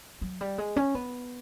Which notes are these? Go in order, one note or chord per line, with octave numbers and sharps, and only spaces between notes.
F#3
G3
G#3
C#4
B3